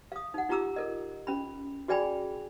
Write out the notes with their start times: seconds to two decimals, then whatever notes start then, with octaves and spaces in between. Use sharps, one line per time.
0.12 F5 D#6
0.34 D#4 F#5
0.49 D#4 F4 G4 A#5 D6 E6
0.76 A4 A#4 D#5
1.27 C#4 B5
1.88 F#4 G#4 D5 G5 G#5 B5